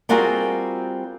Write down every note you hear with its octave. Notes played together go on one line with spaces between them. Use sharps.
G3 C4 F4 F#4 G#4 A#4